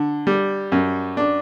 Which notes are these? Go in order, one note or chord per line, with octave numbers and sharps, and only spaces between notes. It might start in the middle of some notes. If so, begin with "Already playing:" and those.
Already playing: D3
G3
F#2
D4